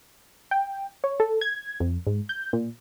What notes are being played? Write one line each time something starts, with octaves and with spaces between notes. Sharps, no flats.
G5
C#5
A4
G#6
F2
G#2
G6
A#2